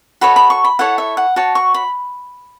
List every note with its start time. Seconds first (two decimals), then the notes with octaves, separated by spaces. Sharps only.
0.21 F#4 A4 C#5 B5
0.36 B5
0.50 C#6
0.64 B5
0.79 E4 A4 C#5 F#5
0.98 E5
1.17 F#5
1.36 F#4 C#5 A5
1.55 C#6
1.74 B5